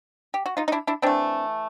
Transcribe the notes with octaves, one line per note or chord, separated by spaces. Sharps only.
G4
F#4
D#4 F4
D#4
D4 E4
D4 E4
E3 A3 C4 D4